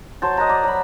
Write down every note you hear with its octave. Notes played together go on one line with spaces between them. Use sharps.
F#3 C5 A5
D#5 F#5 A5 A#5
D5
F#3 B5